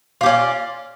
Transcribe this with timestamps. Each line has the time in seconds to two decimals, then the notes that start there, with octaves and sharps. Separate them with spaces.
0.21 F4
0.23 G4
0.26 C#4
0.28 D5